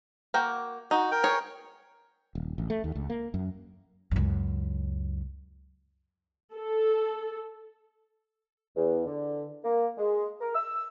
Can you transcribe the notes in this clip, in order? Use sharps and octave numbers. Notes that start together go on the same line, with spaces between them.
A#3 F#4 G5
D#4 F#4
A#4 G5
G#4 C#5
D#1
A1
A3
D#2
C#2
A#3
F#2
C#2 F#2
A4
E2
D3
A#3
G#3
A#4
E6